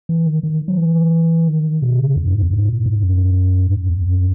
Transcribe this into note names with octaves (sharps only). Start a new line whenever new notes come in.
E3
D#3
D#3
F#3
E3
D#3
B2
C#3
E2
F#2
G#2
E2
G#2
A#2
G#2
F#2
G#2
F#2
E2
F#2